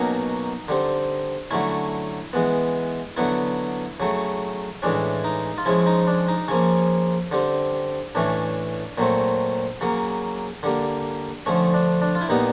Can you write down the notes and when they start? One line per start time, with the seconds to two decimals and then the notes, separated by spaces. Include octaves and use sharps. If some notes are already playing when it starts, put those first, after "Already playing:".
Already playing: B2 F#3 A#3 C#4 D#4
0.68 D3 G3 C4
1.51 D3 F#3 A3 C#4 E4
2.33 E3 G#3 B3
3.17 D3 F#3 B3 E4
4.00 C#3 F#3 A3
4.82 A2 E3 G#3 C#4 D4
5.24 D#4
5.58 F4
5.66 C#3 F3 G#3 C#4 E4
5.86 D#4
6.07 D4
6.28 D#4
6.48 C#3 F3 A#3 C#4
7.31 D3 G3 C4
8.15 A2 E3 A3 C#4 D4
8.98 A#2 F#3 A3 C4
9.81 C#3 F#3 A#3
10.63 D3 G3 A#3
11.46 D3 F3 A3 C#4
11.74 D4
12.02 D4
12.15 F4
12.21 E4
12.29 A#2 G3 B3 D#4